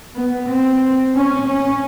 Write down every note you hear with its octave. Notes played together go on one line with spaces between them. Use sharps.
B3
C4
C#4
C#4